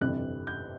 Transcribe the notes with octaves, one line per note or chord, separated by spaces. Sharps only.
G1 F2 C3 E3 G3 F#6
G6